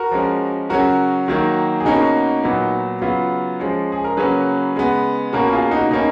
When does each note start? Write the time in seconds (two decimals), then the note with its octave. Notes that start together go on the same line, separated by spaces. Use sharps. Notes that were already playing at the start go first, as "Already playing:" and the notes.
Already playing: F#4 A#4
0.12 F3 G#3 C#4
0.70 C#3 F#3 C#4 F#4 A#4
1.28 D#3 F#3 A#3
1.80 G#4
1.85 B2 A#3 C#4 D#4 F#4
2.43 A#2 F#3 B3
3.02 C#3 F#3 B3 F4
3.60 F3 G#3 C#4
3.92 G#4
4.04 A#4
4.17 C#3 F#3 A#3 C#4 G#4 B4
4.76 C#3 G#3 B3
5.33 B2 A#3 C#4 F#4 A#4
5.47 F#4
5.53 F4 G#4
5.71 D#4 F#4
5.91 B2 A#3 C#4 D#4